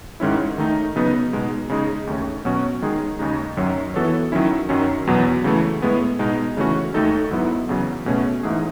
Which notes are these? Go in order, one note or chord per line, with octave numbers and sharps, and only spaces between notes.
G#2 D#3 G#3 C#4 E4
D#3 A3 D#4
C#3 F#3 B3 D#4
B2 G#3 D#4
C#3 G#3 D#4 G#4
D#2 D#3 A3 C#4
B2 F#3 C#4 F#4
D#3 G#3 D#4 G#4
D#2 C#3 G#3 D#4
F#2 D#3 F#3 C#4
E3 B3 F#4 A4 C#5
D#3 F#3 C#4 E4
F#2 D#3 F#3 C#4
E2 B2 F#3
C#3 E3 A3
A2 G#3 B3
B2 G#3 D#4
C#3 E3 A3 C#4 F#4
D#2 D#3 A3 D#4 A4
G#2 F#3 B3 E4
E2 C#3 F#3
B2 A3 C#4 G#4
G#2 E3 A3 D#4 G#4